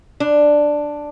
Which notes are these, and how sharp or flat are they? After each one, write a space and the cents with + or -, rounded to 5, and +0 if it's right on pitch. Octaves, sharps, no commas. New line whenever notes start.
D4 +5